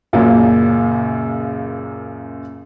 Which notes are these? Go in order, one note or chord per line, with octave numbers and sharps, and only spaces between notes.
C#2 F#2 A#2 C#3